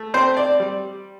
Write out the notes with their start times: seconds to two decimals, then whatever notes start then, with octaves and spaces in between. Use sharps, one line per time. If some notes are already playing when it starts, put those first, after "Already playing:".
Already playing: A3
0.14 C4 C5
0.37 D5
0.60 G3